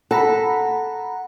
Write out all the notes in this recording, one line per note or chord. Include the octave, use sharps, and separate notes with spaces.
A4 F#5 A#5 B5